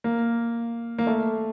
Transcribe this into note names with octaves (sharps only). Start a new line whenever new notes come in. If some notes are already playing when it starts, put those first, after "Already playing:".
A#3
A#3
A3